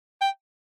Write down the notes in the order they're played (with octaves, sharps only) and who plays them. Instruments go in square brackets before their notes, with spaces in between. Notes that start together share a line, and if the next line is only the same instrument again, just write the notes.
[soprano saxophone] G5